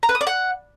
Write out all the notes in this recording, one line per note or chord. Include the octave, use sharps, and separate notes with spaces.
A#5
B4
D#6
D5
F#5